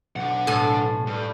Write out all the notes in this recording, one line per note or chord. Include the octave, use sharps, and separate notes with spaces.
B1 D4 F#5
A2 A4 G#5
G2